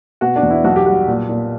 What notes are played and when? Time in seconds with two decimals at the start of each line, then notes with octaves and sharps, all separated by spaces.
0.21 B2 F#4
0.36 D4
0.43 E2
0.50 E4
0.64 B1 F#4
0.76 G4
0.86 G3 F#4
1.07 A#2
1.29 A#2